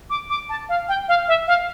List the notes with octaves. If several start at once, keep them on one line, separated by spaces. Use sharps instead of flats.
D6
D6
A5
F5
G5
F5
E5
F5